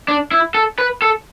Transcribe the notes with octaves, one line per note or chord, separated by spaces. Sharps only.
D4
E4
A4
B4
A4